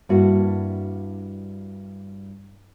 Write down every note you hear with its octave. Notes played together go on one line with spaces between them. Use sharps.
G2 A#3 D4 E4 F#4